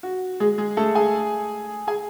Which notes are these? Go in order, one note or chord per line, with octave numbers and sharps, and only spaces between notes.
F#4
G#3 G#4
G#3 G#4
A3 A4
G#4 G#5
G#4 G#5